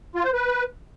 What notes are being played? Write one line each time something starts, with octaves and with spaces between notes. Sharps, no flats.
F4
C5
B4